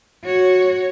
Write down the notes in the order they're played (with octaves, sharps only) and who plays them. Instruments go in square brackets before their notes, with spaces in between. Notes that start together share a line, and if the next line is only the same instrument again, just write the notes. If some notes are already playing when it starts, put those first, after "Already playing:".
[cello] F#4 C#5